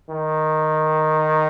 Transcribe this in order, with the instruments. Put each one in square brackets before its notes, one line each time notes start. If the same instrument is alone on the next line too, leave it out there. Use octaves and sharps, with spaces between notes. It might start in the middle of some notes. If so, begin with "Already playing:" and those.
[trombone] D#3